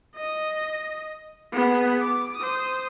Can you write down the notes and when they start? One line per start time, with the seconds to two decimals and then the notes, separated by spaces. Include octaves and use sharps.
0.16 D#5
1.53 B3 G#4
2.00 D6
2.37 C5 D#6